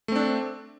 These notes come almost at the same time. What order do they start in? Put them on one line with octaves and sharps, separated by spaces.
A3 C4 D4